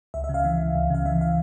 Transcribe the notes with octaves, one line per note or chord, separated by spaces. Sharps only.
C#2 E5
E5
C#3
F5
E3
C#2
C#2
C#3 F5
E3 E5
F5